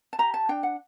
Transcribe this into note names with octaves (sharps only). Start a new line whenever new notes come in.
A5
G4 A#5
A5
D4 G5
F#5